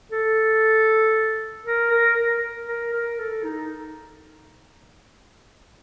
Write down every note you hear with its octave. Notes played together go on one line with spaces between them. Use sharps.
A4
A#4
A#4
A#4
A#4
A#4
A4
D#4